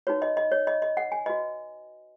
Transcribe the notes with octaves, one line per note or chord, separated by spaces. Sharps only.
D#4 F#4 B4 C#5
D#5
D#5
C#5
D#5
D#5
F#5
G#5
F#4 B4 D#5